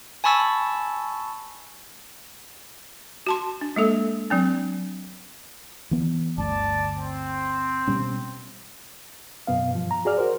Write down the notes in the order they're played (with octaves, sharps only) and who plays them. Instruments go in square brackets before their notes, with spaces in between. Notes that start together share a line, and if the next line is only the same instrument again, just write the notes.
[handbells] G#5 A5 B5 C#6 E6 A6
[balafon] F#4 A5 C6
D4
G#3 A#3 A4
F#3 C4 D4
[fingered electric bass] E3 B3
[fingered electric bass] G1 D2 [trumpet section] D5 A5
[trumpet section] C4
[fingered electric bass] B2 G3 C#4
[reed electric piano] F#2 B2 B3 F5
G2 F3
A#5
F#4 G#4 D5 F6
F#4 A#4 C5